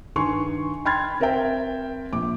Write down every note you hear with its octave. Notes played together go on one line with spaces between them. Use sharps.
G2 D#3 G#5 C6 C#6
G5 B5 C6 F6 G#6 A6
C4 A#4 C5 E5 G5
A#1 D6